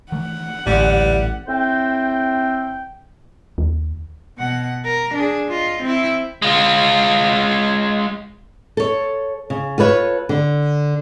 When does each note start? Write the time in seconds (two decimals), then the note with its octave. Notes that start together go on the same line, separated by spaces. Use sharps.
0.12 D#3 E3 A3 F#5
0.66 A1 D2 A#2 G3 A3
1.48 A2 C4 C5 G5
3.58 D#2
4.38 B2 F#5
4.85 A#4
5.14 D4 G#4
5.49 F4 D#5
5.83 C4 E4
6.42 G#3 F4
8.77 A4 C#5
9.50 C#3
9.78 F4 A4 B4 C#5
10.29 D3